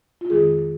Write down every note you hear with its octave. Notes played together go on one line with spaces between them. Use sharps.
F4
F2 D#3 G#3 G#4